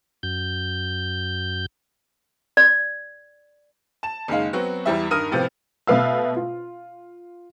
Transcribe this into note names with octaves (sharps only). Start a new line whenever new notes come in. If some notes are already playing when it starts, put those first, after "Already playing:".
F#2 G6
D5
A5 E7
F#1 D#3 G#3 F5
F#3 B3 C4 F#4
E2 E3 G3 E5
G2 D#3 A#4 D#6 F6 D#7
A2 C3 F3 B3
B2 A3 B4 F5 E6
F4